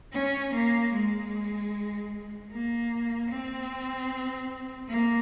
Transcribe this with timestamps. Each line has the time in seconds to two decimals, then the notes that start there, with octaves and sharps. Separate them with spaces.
0.13 C#4
0.54 A#3
0.93 G#3
2.52 A#3
3.30 C4
4.89 A#3